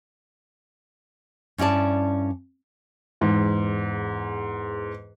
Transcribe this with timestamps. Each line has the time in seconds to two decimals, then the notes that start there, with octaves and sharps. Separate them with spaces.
1.58 G2 C#4 E4 D5 A5
3.21 E2 G#2